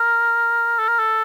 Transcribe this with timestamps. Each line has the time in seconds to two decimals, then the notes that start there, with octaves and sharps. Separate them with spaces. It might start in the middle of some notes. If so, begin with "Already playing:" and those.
Already playing: A#4
0.79 A4
0.89 A#4
0.99 A4